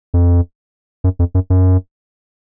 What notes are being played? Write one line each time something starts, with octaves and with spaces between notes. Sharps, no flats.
F2
F#2
F2
F#2
F#2